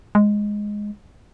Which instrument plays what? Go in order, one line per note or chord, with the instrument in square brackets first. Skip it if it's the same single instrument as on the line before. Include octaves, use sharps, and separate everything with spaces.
[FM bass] G#3